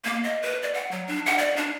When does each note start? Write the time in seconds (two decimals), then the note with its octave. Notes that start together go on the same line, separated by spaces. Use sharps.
0.04 A#3
0.24 D#5
0.42 B4
0.63 D5
0.74 F#5
0.91 F#3
1.07 D4
1.26 F#5
1.38 D5
1.57 D4